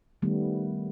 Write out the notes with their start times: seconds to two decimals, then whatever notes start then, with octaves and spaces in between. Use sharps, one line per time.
0.22 D#3 G3 A3 B3